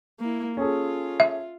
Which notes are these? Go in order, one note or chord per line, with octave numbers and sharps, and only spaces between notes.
A#3 E4
C#4 F4 G#4 A4
E5